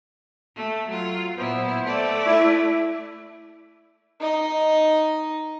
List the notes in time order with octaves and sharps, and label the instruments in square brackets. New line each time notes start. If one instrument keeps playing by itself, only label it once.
[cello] A3
F#3 F4
[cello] A#2 E4 [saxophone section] B3 C5
[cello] A3 D5
[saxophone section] E4
[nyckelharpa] D#4 D#5